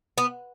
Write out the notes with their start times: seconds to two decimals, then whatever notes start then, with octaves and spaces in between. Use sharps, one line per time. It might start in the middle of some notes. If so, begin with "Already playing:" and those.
0.18 B3